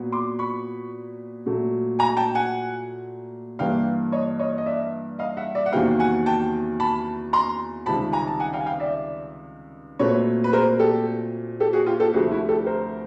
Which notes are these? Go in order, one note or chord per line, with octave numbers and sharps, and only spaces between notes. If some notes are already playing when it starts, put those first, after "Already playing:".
Already playing: A#2 F#3 B3
C6 D6
B5 C#6
A#2 F#3 A3
G#5 A#5
G5 A5
F#5 G#5
G2 E3 G3 A#3 F5 G5
C#5 D#5
C#5 D#5
D#5
D5 E5
D#5 F5
E5 F#5
D5 E5
F#5
E2 C3 D#3 F#3 A#3 F5 G5
F#5 G#5
G5 A5
A5 B5
A#5 C6
C#2 C3 D#3 G3 A5 B5
G#5 A#5
A5
F#5 G#5
F5 G5
G#5
F5 G5
D5 E5
A#2 F#3 A3 C4 B4 C#5
B4
A#4 C5
G4 A4
G4 A4
F#4 G#4
F4 G4
G4 A4
D2 C3 F3 A3 F#4 G#4
E4 F#4
G4 A4
A#4 C5